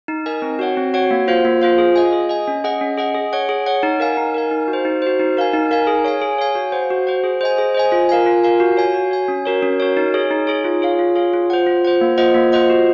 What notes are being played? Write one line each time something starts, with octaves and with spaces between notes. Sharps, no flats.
D#4
A#4 D#5 G#5
C4
F#4 C#5 F#5
C4
F#4 C#5 F#5
A#3
F4 C5 F5
A#3
F4 C5 F5
G#4
D#5 G#5
G#4
D#5 G#5
C#4
G#4 D#5 F#5
C#4
G#4 D#5 F#5
G#4
C#5 F#5
G#4
C#5 F#5
D#4
A#4 F5 G#5
D#4
A#4 F5 G#5
D#4
F#4
C5
D#4
F#4 C5
D#4
A#4 F5 G#5
D#4
A#4 F5 G#5
G#4
C#5 F5 G#5
G#4
C#5 F5 G#5
F#4
C5 F#5
F#4
C5 F#5
G#4
C5 D#5 G#5
G#4
C5 D#5 G#5
F4
A#4 F5 G#5
F4
A#4 F5 G#5
F#4
C#5 G#5
F#4
C#5 G#5
C#4
F#4 A#4 C#5
C#4
F#4 A#4 C#5
D#4
G#4 C#5
D#4
G#4 C#5
F4
G#4 C#5 F5
F4
G#4 C#5 F5
F4
C5 F#5
F4
C5 F#5
A#3
F4 C5 D#5 F#5
A#3
F4 C5 D#5 F#5
F#4